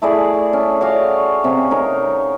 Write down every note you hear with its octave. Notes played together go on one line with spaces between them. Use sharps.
A3 E4 G#4 D5
C#4
F#4 C#5 D5 F5
C3 C#4
C#4 D#4 A#4